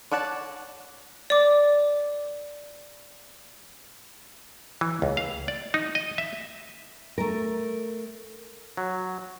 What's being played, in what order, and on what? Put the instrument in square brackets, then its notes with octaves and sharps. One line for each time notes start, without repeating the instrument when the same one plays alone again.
[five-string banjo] C#5 D5 F#5 A5
[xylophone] D5 D6
[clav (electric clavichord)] E3
C#2
F5
D5
D#4
D#5
E5
[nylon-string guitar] A3 A#4
[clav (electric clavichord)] F#3